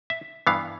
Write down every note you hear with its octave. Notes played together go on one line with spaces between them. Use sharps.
E5
G2 E3 B3 F5